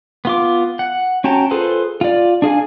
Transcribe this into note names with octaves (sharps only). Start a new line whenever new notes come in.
B3 F4 D6
F#5
C#4 F#4 G5 A5 A#5
F4 G#4 A4 B4 C5
F4 D5
D4 G#4 F5 G#5